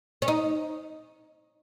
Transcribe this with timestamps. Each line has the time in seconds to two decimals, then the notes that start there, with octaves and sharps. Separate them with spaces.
0.22 C#4
0.28 D#4